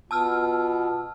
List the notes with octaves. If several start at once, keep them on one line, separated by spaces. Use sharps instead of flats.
B2 B3 F4 A5 E6 F6